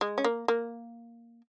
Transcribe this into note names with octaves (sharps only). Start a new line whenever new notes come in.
G#3
C#4
A#3
A#3